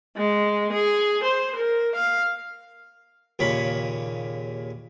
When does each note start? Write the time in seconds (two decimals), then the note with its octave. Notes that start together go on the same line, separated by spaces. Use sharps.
0.17 G#3
0.73 G#4
1.23 C5
1.56 A#4
1.95 F5
3.39 D#2 A#2 C#3 C#5 B5